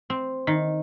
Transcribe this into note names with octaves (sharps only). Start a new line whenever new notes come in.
C4
D#3